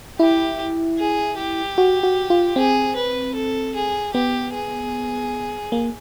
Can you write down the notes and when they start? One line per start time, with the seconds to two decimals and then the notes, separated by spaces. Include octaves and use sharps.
0.19 E4 G4
0.99 G#4
1.38 G4
1.78 F#4
2.03 F#4
2.30 F4
2.56 C4 G#4
2.96 B4
3.35 A4
3.75 G#4
4.14 B3 G4
4.53 G#4
5.72 A#3